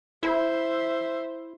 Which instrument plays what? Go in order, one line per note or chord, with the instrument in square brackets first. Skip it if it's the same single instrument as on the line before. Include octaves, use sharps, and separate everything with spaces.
[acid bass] E4 [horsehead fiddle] C5 E5